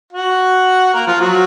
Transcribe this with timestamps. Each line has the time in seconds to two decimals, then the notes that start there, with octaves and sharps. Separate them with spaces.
0.12 F#4 F#5
0.94 A#3 A#4
1.07 F3 F4
1.21 F#3 F#4